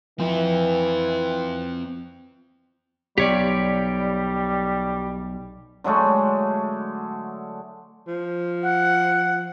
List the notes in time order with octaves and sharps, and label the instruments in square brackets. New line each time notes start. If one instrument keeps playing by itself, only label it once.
[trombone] E3 [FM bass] F3 [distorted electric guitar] C4 F4
[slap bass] B1 [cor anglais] G3 [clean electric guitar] G4 C#5 D5
[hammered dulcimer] D3 F#3 G#3 A3
[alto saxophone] F3
[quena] F#5